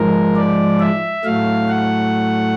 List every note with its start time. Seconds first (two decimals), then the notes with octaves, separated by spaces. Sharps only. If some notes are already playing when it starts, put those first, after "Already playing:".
Already playing: G#2 F3 G#3 A#4
0.36 D5
0.80 E5
1.24 A2 F#3 A3 F5
1.69 F#5